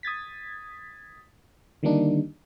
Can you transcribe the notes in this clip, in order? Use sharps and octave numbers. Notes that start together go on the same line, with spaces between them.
D#6 G#6 A6 B6
D3 D#3 G3 A#3 D4 D#4